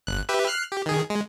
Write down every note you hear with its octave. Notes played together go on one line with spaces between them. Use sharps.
G1 F#6
G4 B4 E5
F6 F#6 C7
G4
D#3 G#4
G#3